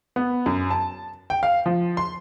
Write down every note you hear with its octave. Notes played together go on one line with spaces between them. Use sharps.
B3
F#2
A5
G5
F5
F3
C6